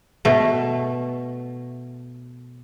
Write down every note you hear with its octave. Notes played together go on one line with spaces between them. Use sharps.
B2 A3